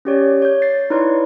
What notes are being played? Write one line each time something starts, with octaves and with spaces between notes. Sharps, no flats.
C#4 G4 C#5 D5
C#5 G6
A6 C7
D#4 E4 B4 C#5 D5 C6